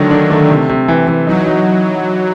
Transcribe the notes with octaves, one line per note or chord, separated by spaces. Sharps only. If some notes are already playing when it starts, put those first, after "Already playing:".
Already playing: D3 D#3 F#3 A3 D4
D4
A3
C3
C3
E3
E3
F#3 D#4
D#4